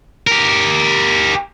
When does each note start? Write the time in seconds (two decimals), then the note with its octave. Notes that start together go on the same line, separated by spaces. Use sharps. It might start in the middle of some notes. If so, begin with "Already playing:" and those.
0.27 G4 A#4